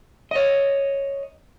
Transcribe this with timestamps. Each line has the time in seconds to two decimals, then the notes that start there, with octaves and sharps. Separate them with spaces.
0.31 C#5 D#5